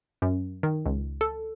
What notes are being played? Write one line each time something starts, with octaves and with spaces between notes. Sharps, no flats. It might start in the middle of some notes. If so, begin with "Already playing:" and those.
F#2
D#3
C#2
A4